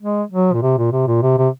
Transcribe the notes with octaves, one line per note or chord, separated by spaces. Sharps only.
G#3
F#3
A#2
C3
A#2
C3
A#2
C3
C3